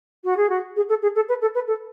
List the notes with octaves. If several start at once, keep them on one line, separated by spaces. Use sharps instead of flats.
F#4
G#4
F#4
G#4
A4
G#4
A4
B4
A4
B4
A4